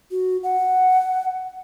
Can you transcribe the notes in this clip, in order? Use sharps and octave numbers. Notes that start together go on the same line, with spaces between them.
F#4
F#5